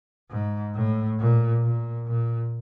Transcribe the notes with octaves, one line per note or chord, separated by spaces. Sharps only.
G#2
A2
A#2
A#2
A#2